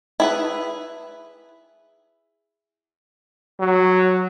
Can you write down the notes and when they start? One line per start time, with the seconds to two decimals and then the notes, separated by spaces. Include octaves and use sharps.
0.20 E4 G#4 B4
3.60 F#3